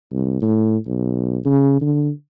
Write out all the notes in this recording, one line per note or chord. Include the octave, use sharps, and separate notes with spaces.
C2
A2
B1
C#3
D3